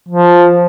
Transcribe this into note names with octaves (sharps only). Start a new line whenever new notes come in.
F3